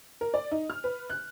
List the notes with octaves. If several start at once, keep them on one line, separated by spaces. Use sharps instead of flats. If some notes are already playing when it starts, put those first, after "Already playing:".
A#4
D5
D#4
F6
B4
F#6